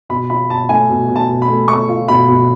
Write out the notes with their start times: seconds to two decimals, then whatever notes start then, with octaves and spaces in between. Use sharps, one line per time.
0.09 B2 B5
0.29 F4 B5
0.50 B2 A5
0.69 A3 G#5
0.89 B2
1.08 B2
1.16 A5
1.29 B2
1.42 B5
1.48 A3
1.68 A3 C#6
1.88 F4
2.08 B2 B5
2.28 B2